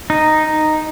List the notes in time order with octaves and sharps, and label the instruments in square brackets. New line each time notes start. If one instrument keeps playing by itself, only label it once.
[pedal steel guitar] D#4